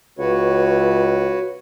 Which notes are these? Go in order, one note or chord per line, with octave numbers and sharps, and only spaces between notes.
C#2 F#4 B4 C#5